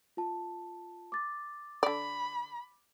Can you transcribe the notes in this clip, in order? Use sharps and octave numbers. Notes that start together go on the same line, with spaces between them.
F4 A5
D6 A6
D3 D5 B5